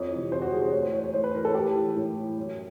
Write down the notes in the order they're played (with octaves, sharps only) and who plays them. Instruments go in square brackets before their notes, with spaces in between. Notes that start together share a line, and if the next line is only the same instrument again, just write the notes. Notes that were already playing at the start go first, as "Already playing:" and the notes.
Already playing: [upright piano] F2 C#5
C3 E3
F2 C5
F#4
C3 E3 G#4
C5
A2 C#5
C5
E3 C#5
C#5
A2 C5
B4
E3 A#4
A4
A2 G4
E3
A2
E3
F#2